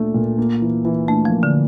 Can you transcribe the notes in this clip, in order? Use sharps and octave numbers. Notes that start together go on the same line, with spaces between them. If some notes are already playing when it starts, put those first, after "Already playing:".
Already playing: A#2 A3 D4
A#2
A#3
E3
E3
A3 D4
F3
A#3
D3